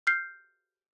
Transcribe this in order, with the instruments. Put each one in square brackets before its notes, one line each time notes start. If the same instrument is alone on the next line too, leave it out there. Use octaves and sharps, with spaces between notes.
[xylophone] F6 G6 C7